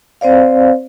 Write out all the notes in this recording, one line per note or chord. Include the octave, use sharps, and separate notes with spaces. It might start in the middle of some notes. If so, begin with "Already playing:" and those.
C4 C5 D5 F5